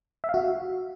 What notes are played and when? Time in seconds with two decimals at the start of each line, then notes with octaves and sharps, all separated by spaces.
0.24 E5
0.29 F5
0.34 F#4